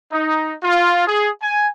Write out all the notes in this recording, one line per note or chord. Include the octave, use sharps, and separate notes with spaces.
D#4
F4
G#4
G#5